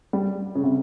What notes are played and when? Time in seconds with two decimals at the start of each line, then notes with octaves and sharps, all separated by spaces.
0.13 G3
0.55 C#3
0.63 C3